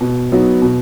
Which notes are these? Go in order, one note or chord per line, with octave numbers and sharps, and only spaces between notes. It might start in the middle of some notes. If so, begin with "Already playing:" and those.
B2
F#3 B3 D#4 F#4
B2